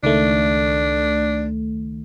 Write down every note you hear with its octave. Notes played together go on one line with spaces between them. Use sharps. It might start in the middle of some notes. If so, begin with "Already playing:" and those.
C#2 D#3 A3 D4